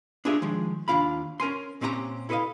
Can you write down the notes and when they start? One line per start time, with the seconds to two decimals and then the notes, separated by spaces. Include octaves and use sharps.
0.25 D4 F4 G4 G#4 A#4 E5
0.42 D#3 F3 G#3
0.88 D#2 F#3 D4 F4 F5 B5
1.40 C#4 A#4 G#5 C6
1.81 A#2 C4 C#4 G4 B4 A#5
2.29 E4 A4 B4 C5 D#5 F5